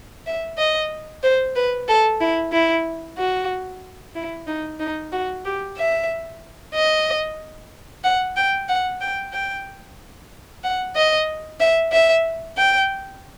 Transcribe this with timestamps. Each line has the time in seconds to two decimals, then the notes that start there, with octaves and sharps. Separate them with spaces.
0.27 E5
0.58 D#5
1.23 C5
1.56 B4
1.88 A4
2.21 E4
2.52 E4
3.18 F#4
4.15 E4
4.47 D#4
4.80 D#4
5.12 F#4
5.45 G4
5.77 E5
6.75 D#5
8.04 F#5
8.37 G5
8.69 F#5
9.01 G5
9.33 G5
10.64 F#5
10.96 D#5
11.60 E5
11.92 E5
12.57 G5